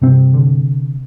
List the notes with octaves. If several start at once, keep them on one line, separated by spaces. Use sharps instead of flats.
G2 C3 C4
D3